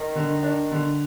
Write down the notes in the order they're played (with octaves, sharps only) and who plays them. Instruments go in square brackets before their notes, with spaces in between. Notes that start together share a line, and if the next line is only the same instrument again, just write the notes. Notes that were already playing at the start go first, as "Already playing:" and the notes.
Already playing: [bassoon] D#3
[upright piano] D3
D4
D3